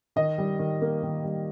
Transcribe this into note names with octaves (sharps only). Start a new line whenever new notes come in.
D#3 D#5
G3
D#3
A#3
D#3
G3